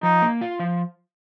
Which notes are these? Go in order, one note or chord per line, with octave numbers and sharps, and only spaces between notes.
F3 D#4
A#3
F4
F3